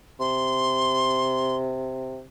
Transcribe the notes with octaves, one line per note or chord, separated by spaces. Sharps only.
C3 C6